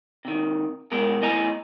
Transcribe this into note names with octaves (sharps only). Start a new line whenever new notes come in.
C3 D#3
B2 G#3 A#4
E2 A2 D#5 G#5 A#5